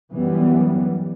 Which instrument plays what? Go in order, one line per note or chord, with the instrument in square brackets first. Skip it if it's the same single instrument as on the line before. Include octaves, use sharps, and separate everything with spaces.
[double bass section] F#2 E3 G3 B3